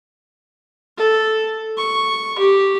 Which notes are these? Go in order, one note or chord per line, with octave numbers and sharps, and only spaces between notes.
A4
C#6
G4